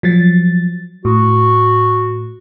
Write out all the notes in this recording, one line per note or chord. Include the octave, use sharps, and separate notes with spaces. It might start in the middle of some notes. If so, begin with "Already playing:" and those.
F3 F#3 A6
A2 F#4